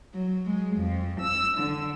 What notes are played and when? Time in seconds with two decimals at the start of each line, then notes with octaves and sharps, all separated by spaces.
0.14 F#3
0.46 G#3
0.78 F2
1.22 E6
1.58 D3